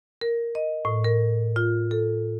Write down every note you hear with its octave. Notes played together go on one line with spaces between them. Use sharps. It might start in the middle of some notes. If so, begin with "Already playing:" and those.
A#4
D#5
A2
A#4
F4
A4